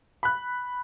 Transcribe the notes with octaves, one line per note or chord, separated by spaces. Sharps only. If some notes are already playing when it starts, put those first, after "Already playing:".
B5 F#6